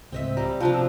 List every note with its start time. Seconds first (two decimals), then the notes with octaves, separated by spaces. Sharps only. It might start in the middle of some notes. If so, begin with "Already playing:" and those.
0.12 C#2 A2 C4 D#5 E5
0.37 G3 A#5
0.60 C3 F3 D4 G5 A#5
0.74 C3 F#4 E6